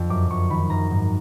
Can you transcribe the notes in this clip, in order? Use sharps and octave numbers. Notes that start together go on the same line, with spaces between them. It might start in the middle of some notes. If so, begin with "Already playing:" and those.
Already playing: F2 D3
F#2 D6
F#2 C#6
D#3 B5
F#2 A#5
G#2